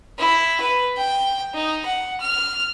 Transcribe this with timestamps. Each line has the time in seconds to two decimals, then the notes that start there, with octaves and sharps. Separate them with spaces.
0.18 E4
0.61 B4
0.97 G5
1.54 D#4
1.86 F#5
2.21 F6